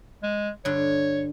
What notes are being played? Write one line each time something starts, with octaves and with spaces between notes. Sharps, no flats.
G#3
G2 D3 C#5